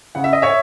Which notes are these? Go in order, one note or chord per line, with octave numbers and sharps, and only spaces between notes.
C#3 F#5
E5
D#5
C#5 E5